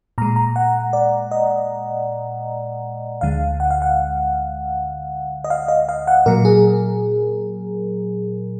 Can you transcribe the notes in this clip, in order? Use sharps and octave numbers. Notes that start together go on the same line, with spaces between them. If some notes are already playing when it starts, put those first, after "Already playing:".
A#2 G#3 A#5
A#5
F#5
D5
D#5
D2 D3 G#3 F5
F#5
F5
F#5
D#5
F5
D#5
F5
F#5
A#2 F#3 A#4
G#4